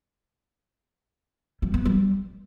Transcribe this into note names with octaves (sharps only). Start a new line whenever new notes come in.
G3
B3
G3